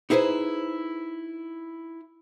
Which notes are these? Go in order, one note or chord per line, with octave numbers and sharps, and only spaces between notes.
D#4 E4 G#4 B4 C5